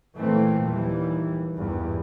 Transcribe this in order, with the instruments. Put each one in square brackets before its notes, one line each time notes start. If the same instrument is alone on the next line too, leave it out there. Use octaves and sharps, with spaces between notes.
[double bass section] A#2 E3 A3 C4
D#2 E3 G3
G#1 E2 G2